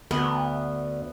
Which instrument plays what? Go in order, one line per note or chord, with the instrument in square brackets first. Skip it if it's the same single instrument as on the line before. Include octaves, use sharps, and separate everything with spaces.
[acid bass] D2 [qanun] B3